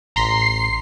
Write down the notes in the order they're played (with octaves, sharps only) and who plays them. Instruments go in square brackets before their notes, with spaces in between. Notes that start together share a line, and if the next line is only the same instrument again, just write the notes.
[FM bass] A1 [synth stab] A#5 C6 B6 [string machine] C7